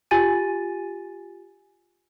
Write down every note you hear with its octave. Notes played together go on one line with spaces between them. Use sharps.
F4 G4 G#5 A6 D#7